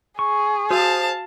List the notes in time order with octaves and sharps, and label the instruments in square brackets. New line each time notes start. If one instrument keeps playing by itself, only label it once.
[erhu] G#4 [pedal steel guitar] C#6
[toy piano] F#4 E6 [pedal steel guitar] C5 D#6 [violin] F5 A5